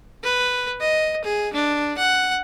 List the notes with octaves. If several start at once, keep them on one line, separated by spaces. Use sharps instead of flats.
B4
D#5
G#4
D4
F#5